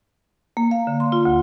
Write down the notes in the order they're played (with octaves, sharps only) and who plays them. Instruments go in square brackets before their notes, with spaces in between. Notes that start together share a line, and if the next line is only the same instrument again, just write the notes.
[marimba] A#3
F5
D3
C6
F4
D2